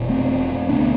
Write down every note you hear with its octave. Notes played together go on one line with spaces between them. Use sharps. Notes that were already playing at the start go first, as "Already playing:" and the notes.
Already playing: F1 B2
A3 C4
D2 C3 B3 D4